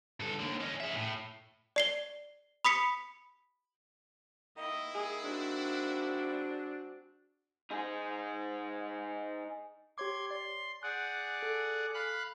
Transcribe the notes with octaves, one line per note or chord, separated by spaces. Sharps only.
G2 A4
D#2 D3
C#4 D#4
G#4 E5
A2
D5 C7 G7
B5 D#6 B6 C#7
D#3 A#3 E4 D#5
G#4
G#3 C4 D4 F#4
D#4 G#4
G4 C#5 C6 D6 G#6
D5 C6
G#4 D5 F#5 F#6 G6
A4
F5 B5 F#6